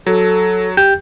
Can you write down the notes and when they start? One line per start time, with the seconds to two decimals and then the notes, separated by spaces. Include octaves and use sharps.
0.07 F#3 A4
0.77 G4 G5 G6